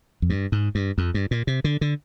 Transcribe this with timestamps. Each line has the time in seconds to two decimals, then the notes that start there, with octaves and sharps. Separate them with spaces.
0.22 F2
0.30 G2
0.52 G#2
0.75 G2
0.98 F2
1.14 G2
1.31 A#2
1.47 C3
1.64 D3
1.81 D3